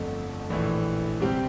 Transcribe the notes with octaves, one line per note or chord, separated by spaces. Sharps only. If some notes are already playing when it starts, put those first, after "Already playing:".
Already playing: G1 F2 D3 A3
A#1 A2 E3
C3 G3 C4 G4